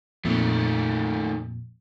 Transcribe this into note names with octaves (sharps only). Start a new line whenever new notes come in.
F2 A#2 D#3 A3